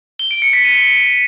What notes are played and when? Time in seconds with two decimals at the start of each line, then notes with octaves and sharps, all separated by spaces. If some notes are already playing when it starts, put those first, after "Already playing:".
0.19 G7
0.31 D7
0.42 C#7
0.53 B6
0.65 D#7